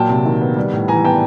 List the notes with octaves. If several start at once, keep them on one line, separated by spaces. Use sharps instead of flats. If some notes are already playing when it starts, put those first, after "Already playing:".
Already playing: A#2 F#3 G5 A5
C3
D#3
B3
G3
A2
E3 G#5 A#5
B3 G5 A5